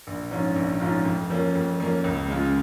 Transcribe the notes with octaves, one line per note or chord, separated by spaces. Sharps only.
A#1
G#2 F3 C#4 F4
A#1
G#2 F3 C#4 F4
F2
F3 A#3 C#4
F2
F3 A#3 C#4
C#2
C#3 G#3 F4